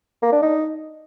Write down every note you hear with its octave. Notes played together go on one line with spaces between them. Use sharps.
A#3
D4
D#4